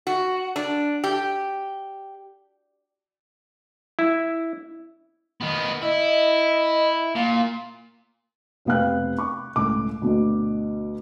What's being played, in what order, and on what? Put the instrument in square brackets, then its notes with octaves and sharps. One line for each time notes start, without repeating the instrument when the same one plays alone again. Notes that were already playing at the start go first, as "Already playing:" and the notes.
[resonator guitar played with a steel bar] F#4
D4
G4
[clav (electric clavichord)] E4
[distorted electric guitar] D#3 B3
[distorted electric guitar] E4 [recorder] D#5
[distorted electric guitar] A#2 [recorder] F5
[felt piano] F1 C3 B3 F5 G5 F#6
C#6 D6
C#2 A2 D6
D2 B2